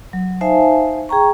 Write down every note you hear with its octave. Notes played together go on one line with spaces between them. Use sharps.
F#3
D#4 C5 E5 F5 G#5 A5
G#4 G5 A#5 C#6